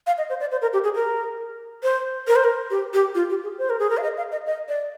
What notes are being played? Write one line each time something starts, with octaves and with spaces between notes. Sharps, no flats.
F5
D#5
C5
D5
C5
A#4
G4
G#4
A#4
C5
A#4
C5
A#4
G4
G4
F4
G4
G#4
C5
A#4
G#4
A#4
F5
D#5
F5
D#5
D#5
D5